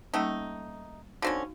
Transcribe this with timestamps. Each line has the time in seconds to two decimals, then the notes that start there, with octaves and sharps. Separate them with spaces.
0.14 G3 A3 A#3 C#4 D#4
1.22 D3 C4 C#4 D#4 F#4 F5